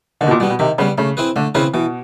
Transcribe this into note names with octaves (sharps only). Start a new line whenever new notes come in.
D3 D#3
B2
A#2
B2 G3 B3
B2
C3 D#3
C#3 G3 B3
C#3 A3
C4 E4 G#4 B4
D3 A3
C#3 C4 E4 G#4 B4
B2 E3